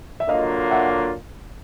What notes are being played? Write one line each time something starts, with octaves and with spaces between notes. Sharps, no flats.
E5
D3 F#3 A#3 D4 F4 D#5 F5
E5 F#5